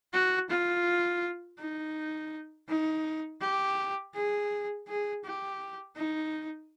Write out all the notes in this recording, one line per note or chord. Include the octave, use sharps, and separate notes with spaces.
F#4
F4
D#4
D#4
G4
G#4
G#4
G4
D#4